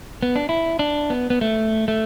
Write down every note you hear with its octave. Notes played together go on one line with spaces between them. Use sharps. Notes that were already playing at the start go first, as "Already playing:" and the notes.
B3
D4
E4
D4
B3
B3
A3
A3